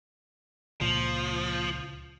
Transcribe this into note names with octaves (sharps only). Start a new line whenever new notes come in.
C#2 A#2 F3